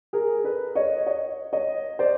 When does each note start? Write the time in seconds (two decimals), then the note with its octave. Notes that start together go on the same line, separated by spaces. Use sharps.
0.13 G#4 A#4
0.44 A4 B4
0.75 C#5 D#5
1.06 C#5 D#5
1.53 C#5 D#5
1.99 C5 D5